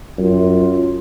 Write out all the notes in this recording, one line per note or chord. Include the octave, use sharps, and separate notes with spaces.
F#2 F4